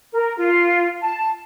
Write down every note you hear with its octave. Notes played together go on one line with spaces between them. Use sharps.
A#4
F4
A5